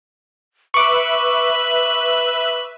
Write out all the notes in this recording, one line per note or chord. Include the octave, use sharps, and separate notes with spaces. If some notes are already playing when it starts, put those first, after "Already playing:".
B4 E5 C#6 D6 F#7